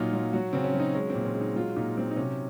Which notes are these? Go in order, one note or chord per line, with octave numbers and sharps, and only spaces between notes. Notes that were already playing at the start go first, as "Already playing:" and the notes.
Already playing: A#2 F#3 D#4 F4
F#3
F#3 F#4
C#3 C4
C#4
F#3
D#4
G#3 C#4
C4
A#2
C#4
G#3
D#4
F#3 F4
A#2 D#4
F#3 C4
D#4
C3 C#4